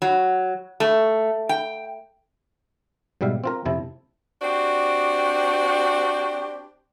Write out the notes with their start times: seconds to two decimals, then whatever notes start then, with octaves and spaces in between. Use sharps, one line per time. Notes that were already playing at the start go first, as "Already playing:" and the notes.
0.02 F#3
0.80 A3
1.49 G5
3.21 G#2 B2 G3 E5 F5
3.44 C4 F4 A#4
3.65 F2 C3 E4 A5
4.42 C4 D4 F#4 G4 C5